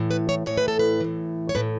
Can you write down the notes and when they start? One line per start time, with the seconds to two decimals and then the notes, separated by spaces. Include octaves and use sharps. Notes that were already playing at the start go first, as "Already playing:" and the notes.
Already playing: A2 E3
0.11 B4
0.29 C#5
0.46 A2 E3 C#5
0.57 B4
0.68 A4
0.79 B4
1.00 A2 E3
1.49 C#5
1.55 A2 E3 B4